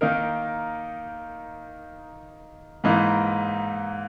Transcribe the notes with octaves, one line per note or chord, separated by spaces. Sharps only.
D#3 A#3 D#4 A#4
G#2 E3 A#3 D#4